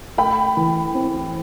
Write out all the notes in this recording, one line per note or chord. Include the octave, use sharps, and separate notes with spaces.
A3 G5 B5
E3
C4